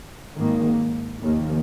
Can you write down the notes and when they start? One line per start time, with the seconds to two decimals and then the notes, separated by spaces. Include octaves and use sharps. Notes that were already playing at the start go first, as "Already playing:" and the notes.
0.35 G#1 G#2 D#3 A#3
1.21 F1 D#2 D#3 A#3